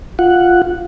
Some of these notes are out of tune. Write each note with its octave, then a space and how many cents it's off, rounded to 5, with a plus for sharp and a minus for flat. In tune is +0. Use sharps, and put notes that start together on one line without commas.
F4 +0 F#5 +0